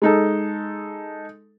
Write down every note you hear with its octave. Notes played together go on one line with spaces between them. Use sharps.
G#3 D#4 A4